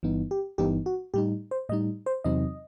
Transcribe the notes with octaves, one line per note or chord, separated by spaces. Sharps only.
G1 G2 E3 B3 D#4
G4
G1 G2 E3 B3 D#4 G4
F#4
A2 G3 D#4 G4
C5
A2 G3 D#4 D#5
C5
E2 C3 F#3 C4 D#4 D#5